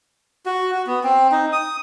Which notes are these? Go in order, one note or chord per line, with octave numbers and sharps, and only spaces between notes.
F#4
F#4
B3
C4
D#4
D#6